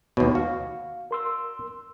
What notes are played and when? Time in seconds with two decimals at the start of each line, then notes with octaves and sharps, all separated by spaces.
0.17 D#2 B2 C#5
0.35 F#4 F5
1.11 A#4 C6 E6